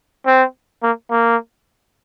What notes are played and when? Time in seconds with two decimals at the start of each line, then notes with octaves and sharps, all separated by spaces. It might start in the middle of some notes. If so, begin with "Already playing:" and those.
0.26 C4
0.83 A#3
1.11 A#3